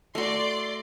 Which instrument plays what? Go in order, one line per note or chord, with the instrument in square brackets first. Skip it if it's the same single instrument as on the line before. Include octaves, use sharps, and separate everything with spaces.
[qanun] A3 F#4 [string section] D5 C6